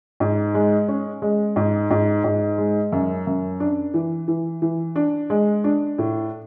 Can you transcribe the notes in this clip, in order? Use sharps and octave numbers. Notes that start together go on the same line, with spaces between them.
G#2
G#3
C#4
G#3
G#2
G#2
G#2
G#3
F#2
F#2
D4
E3
E3
E3
D4
G#3
D4
A2